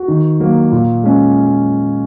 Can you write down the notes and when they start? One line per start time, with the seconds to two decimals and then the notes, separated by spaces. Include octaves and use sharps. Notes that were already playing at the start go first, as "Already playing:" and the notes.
Already playing: F#4
0.08 D#3
0.40 F#3 A#3
0.72 A#2
1.04 G#3 C#4